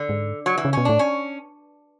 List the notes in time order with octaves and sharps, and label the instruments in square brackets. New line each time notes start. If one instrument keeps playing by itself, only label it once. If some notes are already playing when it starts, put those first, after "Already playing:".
Already playing: [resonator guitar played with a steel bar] D3
[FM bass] G#2
[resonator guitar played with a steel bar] F#3
E3
[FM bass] C#3
[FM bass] B2 [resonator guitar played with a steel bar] C#4
[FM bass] A2 [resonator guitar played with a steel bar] D4
[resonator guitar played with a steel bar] C#4